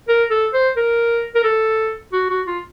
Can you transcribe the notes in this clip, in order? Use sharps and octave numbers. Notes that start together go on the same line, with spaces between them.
A#4
A4
C5
A#4
A#4
A4
F#4
F#4
F4